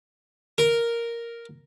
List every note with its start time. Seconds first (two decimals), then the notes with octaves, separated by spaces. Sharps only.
0.58 A#4